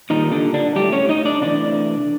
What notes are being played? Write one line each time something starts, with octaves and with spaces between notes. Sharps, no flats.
A#2 D#3 G3 D#4
D3 D4
D3 D4
A2 F#3 G3 A3 G4
C#4 C#5
D#4 D#5
D4 D5
C3 E3 A3 D4 D5